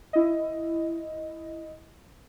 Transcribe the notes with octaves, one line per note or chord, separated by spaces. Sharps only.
E4 D#5